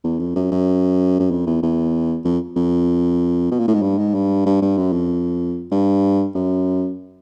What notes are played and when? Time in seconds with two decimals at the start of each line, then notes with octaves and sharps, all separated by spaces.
0.04 E2
0.20 F2
0.36 F#2
0.52 F#2
1.20 F#2
1.31 F2
1.47 E2
1.63 E2
2.25 F2
2.56 F2
3.51 B2
3.60 A#2
3.68 A2
3.74 G#2
3.82 G2
3.98 G#2
4.14 G2
4.46 G2
4.62 G2
4.77 F#2
4.93 F2
5.71 G2
6.35 F#2